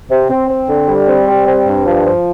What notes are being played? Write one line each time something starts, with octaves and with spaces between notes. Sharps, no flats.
C3
C4
C4
D3
G3
C4
G3
C4
G2
F3
F3